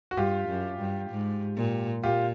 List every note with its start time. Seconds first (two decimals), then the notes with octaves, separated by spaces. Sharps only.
0.11 F#4
0.17 G2 F4 G4
0.48 F#2
0.79 G2
1.10 G#2
1.57 A#2
2.03 A#2 F4 G4